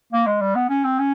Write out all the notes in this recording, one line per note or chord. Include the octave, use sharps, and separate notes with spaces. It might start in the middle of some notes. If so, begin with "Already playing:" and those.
A#3
G#3
G3
B3
C#4
C4
C#4